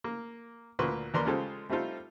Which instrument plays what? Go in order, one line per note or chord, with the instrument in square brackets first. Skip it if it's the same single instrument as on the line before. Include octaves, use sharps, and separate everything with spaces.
[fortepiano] A#3
D2 A#2 A#3 B4 C6 C#6
D#2 A#3 A#4 B4 D5 C6
C#3 G#3 F4 G4 A4 C5
G3 A3 C4 D#4 F4 A4